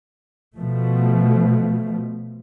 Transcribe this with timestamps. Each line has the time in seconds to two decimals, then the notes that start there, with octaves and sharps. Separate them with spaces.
0.57 B2 F3 A3